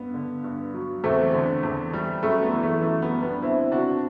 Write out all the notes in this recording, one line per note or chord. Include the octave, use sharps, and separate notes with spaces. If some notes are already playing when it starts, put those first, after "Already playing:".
Already playing: G2 B3
D3
G2
F#3
E2 A3 C4
D3
E2
G3
F#2 A3
B3
E3
A3
F#2 A3
B3
G3
B3 D4
D2 C4 E4
C3 D4 F#4